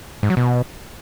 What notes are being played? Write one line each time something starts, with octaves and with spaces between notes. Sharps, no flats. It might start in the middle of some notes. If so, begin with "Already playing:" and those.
G#2
F#3
B2